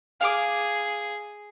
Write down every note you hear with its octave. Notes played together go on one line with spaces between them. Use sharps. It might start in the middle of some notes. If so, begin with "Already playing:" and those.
G#4 F5 D6